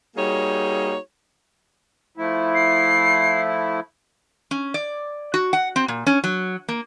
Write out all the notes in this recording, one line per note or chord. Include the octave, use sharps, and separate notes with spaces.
G3 A#3 D#4 F#4 G#4 C#5
F3 A3 E4
C7
C#4
D5
F#4
F#5
C4
A#2
C#4
F#3
A#3